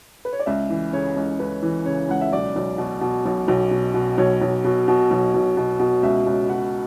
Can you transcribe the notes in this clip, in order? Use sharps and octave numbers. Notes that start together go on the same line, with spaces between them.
B4
C#5
D5
C#2 E5
E3
C#3 C#5
C#2
C#2 B4
E3
C#3 C#5
C#2 F#5
E5
B1 D5
B1
B2
B2
B1
B1
B2
B2
B1 C#5
B1
B2
B2
B1
B1
B2
B2
C#2 E5
C#2
B2 F#5